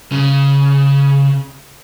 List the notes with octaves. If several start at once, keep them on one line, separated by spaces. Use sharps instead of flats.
C#3